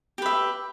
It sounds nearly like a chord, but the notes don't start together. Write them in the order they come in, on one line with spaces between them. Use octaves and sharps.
G4 B4 E5